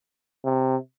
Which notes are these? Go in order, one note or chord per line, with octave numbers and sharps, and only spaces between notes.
C3